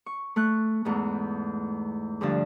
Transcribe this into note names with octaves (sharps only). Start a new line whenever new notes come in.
C#6
A3 C#6 F#6
E2 G#2 A3
D2 G2 D3 F3 A5